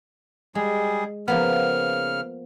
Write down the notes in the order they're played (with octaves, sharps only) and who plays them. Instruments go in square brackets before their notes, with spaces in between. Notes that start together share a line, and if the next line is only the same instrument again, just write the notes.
[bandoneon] G3 G#4 [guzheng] G#3
[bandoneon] C#3 F6 [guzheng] F3 A#3 B3